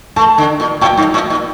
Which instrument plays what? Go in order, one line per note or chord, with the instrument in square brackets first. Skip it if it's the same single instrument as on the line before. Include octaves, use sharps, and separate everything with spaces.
[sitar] A3 [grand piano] A5
[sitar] D3
A#2
[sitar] A2 [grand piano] G5
[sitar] G2
A2
A#2